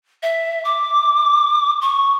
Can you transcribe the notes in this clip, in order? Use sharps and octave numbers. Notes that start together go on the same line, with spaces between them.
E5
D6
C#6